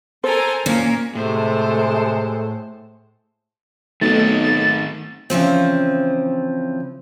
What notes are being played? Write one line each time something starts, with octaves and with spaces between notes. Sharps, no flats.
A4 A#4 C5 G#5
A#2 A#3 C#4
A2 C3 G#3 A3 C5 A5
B1 D#3 A3 C4 D#4 A6
C#3 E3 F3 C4